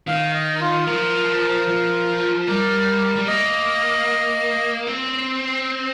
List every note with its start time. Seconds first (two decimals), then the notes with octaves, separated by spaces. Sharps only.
0.07 D#3 F5
0.34 D#5
0.55 D#4
0.60 F4
0.87 F3 A#4
1.67 F3
2.47 G3 A#4
3.16 G3
3.27 A#3 D#5
4.87 C4